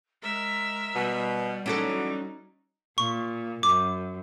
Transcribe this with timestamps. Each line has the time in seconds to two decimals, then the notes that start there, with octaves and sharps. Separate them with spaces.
0.23 G#3 A#4 E5
0.95 B2 G3
1.66 E3 F#3 C#4 D#4 F#4 A4 D5
2.98 A#2 C#6
3.63 F#2 D6